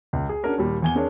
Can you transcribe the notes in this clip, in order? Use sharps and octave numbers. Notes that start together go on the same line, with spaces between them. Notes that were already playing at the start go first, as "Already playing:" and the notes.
C#2
G#4
C#4 D4 F#4 G#4 A#4 C#5
D#2 A#2 G3
E2 G#5 G7
C4 D4 G#4 A#4 C#5